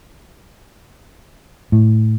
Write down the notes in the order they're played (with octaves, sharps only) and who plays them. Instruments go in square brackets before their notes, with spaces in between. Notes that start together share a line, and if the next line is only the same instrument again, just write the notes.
[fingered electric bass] A2